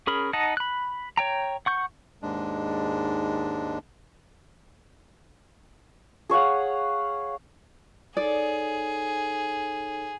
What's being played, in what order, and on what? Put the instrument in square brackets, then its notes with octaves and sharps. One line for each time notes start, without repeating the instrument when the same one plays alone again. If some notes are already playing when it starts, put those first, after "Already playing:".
[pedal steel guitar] C#4 G#4 A#4 B5
D#4 D#5 F#5 A5
B5 F#6
C#5 G5 A#5
F#5 C#6 G6
[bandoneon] D#2 G#2 G#3 D4
[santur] G#4 C#5 F5 F#5
[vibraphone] D#4 A4 C#5 [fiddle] G#4 [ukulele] D5